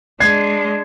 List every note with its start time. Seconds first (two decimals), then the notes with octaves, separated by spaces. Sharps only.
0.20 G#3 D4 G#6 C7